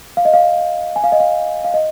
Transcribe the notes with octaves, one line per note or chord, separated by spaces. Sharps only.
F5
D#5
F5
G#5
F5
D#5
F5
F5
D#5